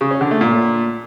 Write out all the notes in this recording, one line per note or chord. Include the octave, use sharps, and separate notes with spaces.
C#3
C#4
D3
A3
A#2